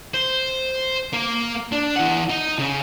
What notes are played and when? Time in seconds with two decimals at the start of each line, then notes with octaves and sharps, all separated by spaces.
0.14 C5
1.13 A#3
1.72 D4
1.96 E3 F#5
2.30 D#4
2.58 C#3